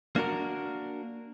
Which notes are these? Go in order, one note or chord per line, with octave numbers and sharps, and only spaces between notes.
A#3 D4 F#4 A#4